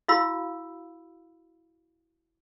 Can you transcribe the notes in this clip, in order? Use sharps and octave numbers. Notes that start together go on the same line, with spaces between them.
E4 F#4 F5 B5 E6